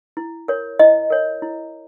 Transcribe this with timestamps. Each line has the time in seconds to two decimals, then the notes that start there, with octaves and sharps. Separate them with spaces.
0.17 E4
0.48 A#4 C#5
0.79 E4 D#5
1.10 A#4 C#5
1.42 E4